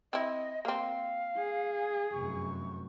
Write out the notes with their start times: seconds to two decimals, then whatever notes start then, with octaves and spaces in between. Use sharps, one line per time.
0.13 C4 E4 D#5
0.65 A#3 C4 F5
1.37 G#4
2.12 F1 F#2 C#6